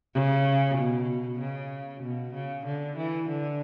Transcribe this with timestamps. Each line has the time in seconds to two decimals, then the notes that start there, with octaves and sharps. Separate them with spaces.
0.14 C#3
0.78 B2
1.40 C#3
2.03 B2
2.34 C#3
2.65 D3
2.98 E3
3.28 D3